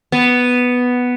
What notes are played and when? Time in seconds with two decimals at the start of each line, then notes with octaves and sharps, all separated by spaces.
0.12 B3